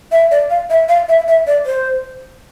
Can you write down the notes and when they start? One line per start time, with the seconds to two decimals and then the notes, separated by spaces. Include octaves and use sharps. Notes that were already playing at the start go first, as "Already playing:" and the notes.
0.12 E5
0.31 D5
0.50 F5
0.70 E5
0.89 F5
1.08 E5
1.28 E5
1.47 D5
1.66 C5